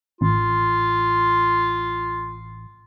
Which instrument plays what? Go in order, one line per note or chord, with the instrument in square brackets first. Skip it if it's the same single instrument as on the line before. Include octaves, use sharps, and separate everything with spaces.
[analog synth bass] A1 [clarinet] F4